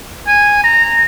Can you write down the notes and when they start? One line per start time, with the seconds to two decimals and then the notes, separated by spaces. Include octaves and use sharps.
0.27 G#5
0.64 A#5